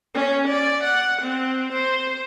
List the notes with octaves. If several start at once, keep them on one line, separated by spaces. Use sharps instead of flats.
C#4
D5
F#5
C4
C5